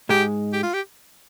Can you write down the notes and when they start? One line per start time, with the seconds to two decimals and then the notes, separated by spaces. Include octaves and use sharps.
0.09 G#2 G#3 G4
0.53 G4
0.63 F4
0.73 G4